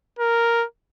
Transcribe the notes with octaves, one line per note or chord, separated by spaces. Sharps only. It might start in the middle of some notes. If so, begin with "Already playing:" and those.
A#4